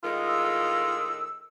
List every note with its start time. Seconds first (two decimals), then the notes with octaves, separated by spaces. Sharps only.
0.03 A2 D#3 G#3 F4
0.28 E6